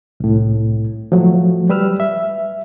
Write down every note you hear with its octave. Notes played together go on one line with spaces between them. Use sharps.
C2 A2
F3 F#3 A3
G3 B4 E6 F6
E5